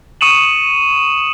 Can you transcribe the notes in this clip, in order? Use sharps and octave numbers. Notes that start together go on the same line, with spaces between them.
C#6 D#6 C#7 D#7 E7 F#7